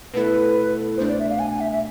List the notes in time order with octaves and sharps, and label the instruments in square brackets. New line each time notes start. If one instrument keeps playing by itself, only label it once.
[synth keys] B2 A3 E4 A4 [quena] B4
[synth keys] C2 B2 A3 D4 [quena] C5
[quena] D5
E5
F5
G#5
G#5
E5
E5